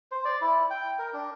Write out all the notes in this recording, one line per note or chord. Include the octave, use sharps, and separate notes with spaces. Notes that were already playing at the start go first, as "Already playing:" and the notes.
C5
D5
E4
G5
A#4
D4